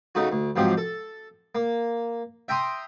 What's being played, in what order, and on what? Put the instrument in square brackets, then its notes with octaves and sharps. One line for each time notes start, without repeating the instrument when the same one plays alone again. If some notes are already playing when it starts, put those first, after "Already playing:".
[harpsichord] C#3 A3 D#4 F#4
D2
G#2 F3 F#3 C4 G4
A4
A#3
E5 G5 A#5 C6 D#6